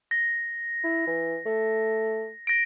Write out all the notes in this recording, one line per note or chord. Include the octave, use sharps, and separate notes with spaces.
A#6
E4
E3
A3
A#6 D7